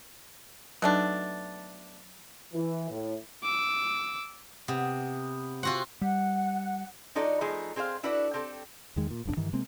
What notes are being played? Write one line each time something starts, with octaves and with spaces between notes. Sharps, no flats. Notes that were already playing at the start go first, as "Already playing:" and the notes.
B2 F#3 A3 D4 D#4
E3
A2
D6 E6
C3 B3
C4 F4 F#4 F#5 C6
G3 F#5
F3 D#4 F#4 A4 D5 D#5
F3 A3 B3 D#4 G#4
C4 G#4 C5 C#5 F5
D4 E4 F#4 A4 B4 D5
C4 G4 A4
E2 D#3 G#3
A#2
F1 B1 F2 D4
G2 D#3 E3
C3 G#3 A#3 C4